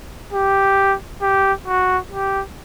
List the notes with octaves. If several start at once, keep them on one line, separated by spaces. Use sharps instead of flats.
G4
G4
F#4
G4